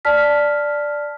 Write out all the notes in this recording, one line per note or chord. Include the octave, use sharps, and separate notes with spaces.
D5 A5 F6 B6